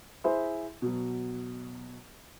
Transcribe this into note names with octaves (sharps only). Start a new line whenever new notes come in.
E4 G#4 C5 E5 B5
B2 F#3